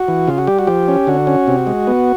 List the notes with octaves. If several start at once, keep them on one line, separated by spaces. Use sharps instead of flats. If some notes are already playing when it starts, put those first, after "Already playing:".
Already playing: F#4
E3
C#3 F4
F#4
G3 G4
F#4
F3 G4
C#4
D3 F#4
C#4
C3
G#3
B3